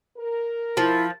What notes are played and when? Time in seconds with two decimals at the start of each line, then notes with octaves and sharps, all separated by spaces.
0.18 A#4
0.77 F3 E4